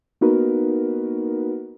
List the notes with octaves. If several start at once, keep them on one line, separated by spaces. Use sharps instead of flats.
A#3 B3 D#4 F#4 A#4 B4